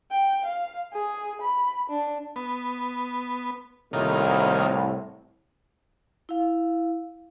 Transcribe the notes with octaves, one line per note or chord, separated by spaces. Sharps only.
G5
F5
G#4
B5
D4
B3
C2 A2 D#3 A#3 F4
E4 F5